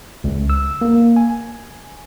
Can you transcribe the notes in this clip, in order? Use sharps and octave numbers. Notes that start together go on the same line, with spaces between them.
C#2
E6
A#3
G#5